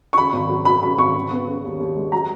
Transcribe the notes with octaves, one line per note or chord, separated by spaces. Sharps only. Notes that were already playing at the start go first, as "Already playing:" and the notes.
C#6
C#3 B5
G#1
F#3
F#3 B5
C#3 B5
G#1 C#6
C#3
B3
C#3
D#2
D#2
G#3
F#3 A#5